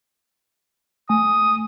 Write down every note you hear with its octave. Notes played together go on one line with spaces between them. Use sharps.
A3 G#5 D#6